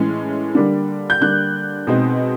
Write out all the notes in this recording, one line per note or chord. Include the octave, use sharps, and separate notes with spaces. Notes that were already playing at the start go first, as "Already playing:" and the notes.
Already playing: A2 E3 G#3 C#4
D3 G3 A#3 D4
G6
D3 G3 A#3 D4 F#6
B2 G#3 C4 D#4